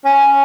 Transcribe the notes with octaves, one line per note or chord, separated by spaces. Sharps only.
C#4